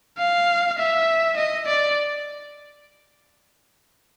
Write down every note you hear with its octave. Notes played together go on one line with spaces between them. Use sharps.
F5
E5
D#5
D5